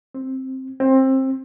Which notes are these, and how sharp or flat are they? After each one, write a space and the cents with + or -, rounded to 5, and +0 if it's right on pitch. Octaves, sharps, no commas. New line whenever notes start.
C4 +5
C4 +20